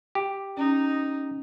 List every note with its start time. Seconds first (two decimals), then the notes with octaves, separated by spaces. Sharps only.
0.15 G4
0.57 C#4 D#4